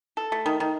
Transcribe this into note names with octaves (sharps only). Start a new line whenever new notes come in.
A4
A3
D#3
D#3